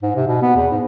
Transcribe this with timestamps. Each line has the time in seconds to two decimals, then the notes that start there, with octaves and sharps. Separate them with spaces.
0.02 G#2
0.16 C3
0.27 B2
0.42 B3
0.56 E2
0.71 G#2